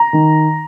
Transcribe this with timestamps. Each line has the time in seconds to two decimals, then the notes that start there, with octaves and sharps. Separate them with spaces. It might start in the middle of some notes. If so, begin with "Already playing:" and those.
Already playing: A#5
0.13 D#3